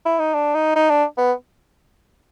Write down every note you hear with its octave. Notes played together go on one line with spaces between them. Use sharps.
E4
D#4
D4
D#4
D#4
D4
B3